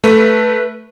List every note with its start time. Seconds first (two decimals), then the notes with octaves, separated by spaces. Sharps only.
0.04 A3 B4